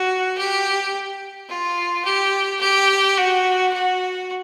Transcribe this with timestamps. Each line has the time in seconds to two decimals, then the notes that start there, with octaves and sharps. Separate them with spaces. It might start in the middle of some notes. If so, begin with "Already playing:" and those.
Already playing: F#4
0.38 G4
1.49 F4
2.05 G4
2.61 G4
3.17 F#4
3.73 F#4